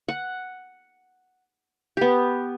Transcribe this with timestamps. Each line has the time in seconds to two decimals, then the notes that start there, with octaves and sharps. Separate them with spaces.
0.08 F#5
1.97 B3 G4